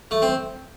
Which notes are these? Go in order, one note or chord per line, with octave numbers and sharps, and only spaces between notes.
A3
C4